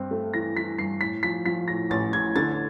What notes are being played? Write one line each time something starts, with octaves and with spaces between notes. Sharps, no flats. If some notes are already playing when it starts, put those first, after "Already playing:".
Already playing: G2 C4
A3
E3 A#6
E3 B6
G2 C7
A2 B6
F3 B6
F3 B6
A2 A#6
A1 A6
A2 G#6
D3 A6